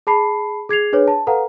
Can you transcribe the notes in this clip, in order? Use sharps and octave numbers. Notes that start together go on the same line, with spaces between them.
G#4 A5 B5 C7
G#4 G#6 C7 F7
D4 G#4 B4 C#5
A5
A4 B4 F5 F#5 A#5